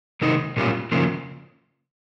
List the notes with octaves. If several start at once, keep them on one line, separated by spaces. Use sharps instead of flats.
C3 D#3 G#3 D#4
A#2 G3 C#4 F4
C#3 F3 A#3